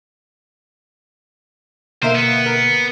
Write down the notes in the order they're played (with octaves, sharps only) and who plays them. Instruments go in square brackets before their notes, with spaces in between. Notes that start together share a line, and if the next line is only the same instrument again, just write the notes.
[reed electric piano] B2 D3 A#3 [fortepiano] A#4 E5 F5 [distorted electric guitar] C5
[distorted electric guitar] B3
[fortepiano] A#4